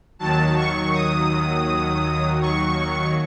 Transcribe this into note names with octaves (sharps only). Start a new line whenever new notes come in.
D#2 D#3 F#3 A5
C#6
D#6
C#6